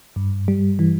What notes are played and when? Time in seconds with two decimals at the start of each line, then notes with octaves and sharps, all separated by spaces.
0.16 G2
0.48 G3
0.79 E3